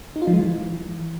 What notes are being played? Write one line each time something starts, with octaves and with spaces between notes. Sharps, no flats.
D#4
F4
F3
G#3
E3